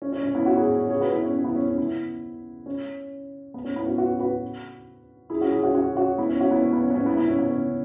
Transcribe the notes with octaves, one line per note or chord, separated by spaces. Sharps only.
C#4
C#4
C#4
B3 E4
C#4 F#4
E4 G#4
C#4
C#4
G#4 C#5
F#4 B4
B3 E4
C#4
C#4
B3 E4
C#4
C#4
B3 E4
C#4
B3
C#4
B3 E4
C#4 F#4
F#4 B4
F#4 B4
E4 G#4
C#4 F#4
E4 G#4
C#4 F#4
C#4 F#4
C#4 F#4
B3 E4
C#4
C#4 F#4
B3 E4
C#4
B3
C#4
B3
C#4
B3 E4
B3 E4
C#4
B3
C#4